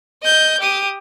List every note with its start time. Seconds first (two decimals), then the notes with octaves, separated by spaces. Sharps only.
0.23 D#5 G6
0.60 G4 D#6